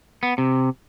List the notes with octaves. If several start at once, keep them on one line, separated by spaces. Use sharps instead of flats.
B3
C3